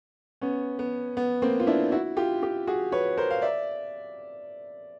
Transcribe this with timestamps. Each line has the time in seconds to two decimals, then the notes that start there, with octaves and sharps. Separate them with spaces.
0.42 B3 C#4
0.79 B3
1.17 B3
1.42 A#3 C4
1.60 F4
1.67 D4 E4
1.92 E4 F#4
2.17 F4 G4
2.42 F4 G4
2.67 F#4 G#4
2.92 B4 C#5
3.17 A#4 C5
3.31 F5
3.42 D5 E5